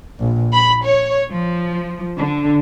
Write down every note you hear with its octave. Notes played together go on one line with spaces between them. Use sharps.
A#1
B5
C#5
F3
D3